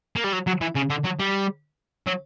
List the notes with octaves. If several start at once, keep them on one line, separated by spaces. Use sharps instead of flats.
A#3
G3
F#3
F#3
E3
C#3
D3
F#3
G3
F#3